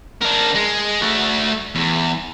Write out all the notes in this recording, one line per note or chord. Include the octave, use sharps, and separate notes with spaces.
D4 A#4
G#3
A3 F#4
E2